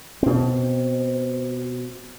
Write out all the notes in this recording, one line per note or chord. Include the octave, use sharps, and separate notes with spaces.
B2 C4